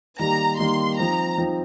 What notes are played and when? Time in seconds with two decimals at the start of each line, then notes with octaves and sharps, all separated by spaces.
0.19 D#3 G3 A#3 G4 A#5
0.58 D#3 G3 A#3 G4 C6
0.98 F3 C4 D#4 A#5
1.38 F3 C4 D#4